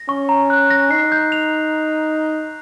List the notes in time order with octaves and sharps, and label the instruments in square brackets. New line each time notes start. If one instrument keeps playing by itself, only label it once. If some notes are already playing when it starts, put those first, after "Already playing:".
Already playing: [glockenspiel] A#6
[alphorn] C#4 [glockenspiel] C#6
[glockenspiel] A#5
F#6
A#6
[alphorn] D#4 [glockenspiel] C7
[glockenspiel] G6
F7